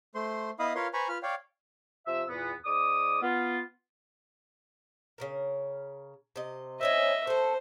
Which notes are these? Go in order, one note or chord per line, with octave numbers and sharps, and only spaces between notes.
A3 C5 C6
B3 E4 D#5 F5 B5 D#6
F4 A#4 B4 C#5 F5 C6
B4 C5 G#5 A#5 B5 C#6
F4 B4 F6
C#5 D5 F5 G5
C3 F3 E5 E6
E2 A#2 B3
G#2 D5 D6 D#6
B3 F4
C#3 E3 A#4
C3 D#5
C4 C#4 D#4 D#5 E5
A3 A4 C5